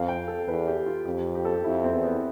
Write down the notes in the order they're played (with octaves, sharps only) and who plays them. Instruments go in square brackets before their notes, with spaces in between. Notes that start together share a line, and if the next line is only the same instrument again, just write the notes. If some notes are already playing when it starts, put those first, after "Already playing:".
Already playing: [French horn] F2 [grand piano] F5
[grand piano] G5
A4
[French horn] E2 [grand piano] B4
[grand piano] G4
F4
[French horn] F2 [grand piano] G4
[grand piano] G4
A4
G4
[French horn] F2 [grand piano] E4
[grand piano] C4
[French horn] E2
[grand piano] B3